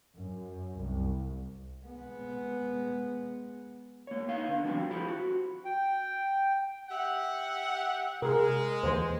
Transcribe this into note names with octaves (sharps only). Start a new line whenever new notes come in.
F#2
C2
G#3 B3
A#3 C#5
B3 D#4 F5
D3 B3
F3 G3 C4 D4 F#4 A5
E4 F4 G4 A4 C5 E5
F#4
G5
G4 E5 F#5
C3 G#3 G#4 A#4
D#2 D3 E3 C5